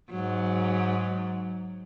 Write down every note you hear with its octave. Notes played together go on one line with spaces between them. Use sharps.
G#2 F#3